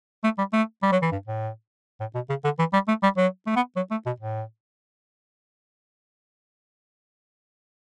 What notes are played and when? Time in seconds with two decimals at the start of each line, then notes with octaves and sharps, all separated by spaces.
0.24 A3
0.38 G3
0.53 A3
0.82 G3
0.92 F#3
1.02 E3
1.12 G2
1.27 A2
2.00 A2
2.15 B2
2.29 C#3
2.44 D3
2.59 E3
2.73 G3
2.88 A3
3.03 G3
3.17 F#3
3.47 A3
3.56 B3
3.76 F#3
3.91 A3
4.06 B2
4.20 A2